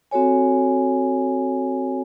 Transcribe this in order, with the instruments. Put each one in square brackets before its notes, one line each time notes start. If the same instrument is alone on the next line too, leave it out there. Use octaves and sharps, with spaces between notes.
[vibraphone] C4 F#4 A4 C#5 G#5